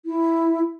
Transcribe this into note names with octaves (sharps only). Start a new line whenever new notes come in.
E4